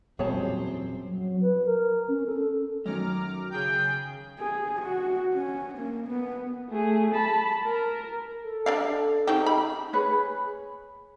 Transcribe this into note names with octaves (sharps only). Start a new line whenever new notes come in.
E1 F#2 A#2 G3 C4 G#4 C#5 A5
F#3
B4
A#4
C#4
A4
F#2 D#3 C#4 A#5 D6 F6
C#3 G#4 G5 G6
G#4
F#4
C#4
A#3
B3
A3 G#4
A5 B5
A#4
A4
D4 D5 F5
C#3 C4 D#4 G4
B5
G#4 B4 C#5